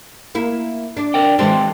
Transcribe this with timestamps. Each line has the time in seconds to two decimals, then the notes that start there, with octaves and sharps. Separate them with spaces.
0.35 A#3 E4
0.97 D4
1.14 A#4 D5 G5
1.39 E3 G#3 C4 G4 A4